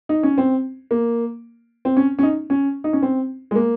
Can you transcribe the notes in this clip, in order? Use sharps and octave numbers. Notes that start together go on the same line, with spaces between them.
D#4
C#4
C4
A#3
C4
C#4
C#4
D#4
C#4
D#4
C#4
C4
G#3
A#3